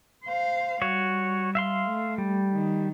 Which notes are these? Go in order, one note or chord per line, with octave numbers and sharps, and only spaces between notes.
C5 F5
G3 F#4 C#5
E5 F5 C6
A3
G3
D#3